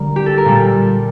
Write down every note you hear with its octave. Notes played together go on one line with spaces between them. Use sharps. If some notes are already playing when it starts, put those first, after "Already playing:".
Already playing: D3 G3 A#3 A#4
G4
A4
A#4
A#2 G3 A4